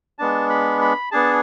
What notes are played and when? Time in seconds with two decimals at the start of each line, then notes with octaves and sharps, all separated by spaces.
0.19 G#3 B3 D4 A5
0.50 B5
0.81 B5
1.11 B3 D4 G#4 A5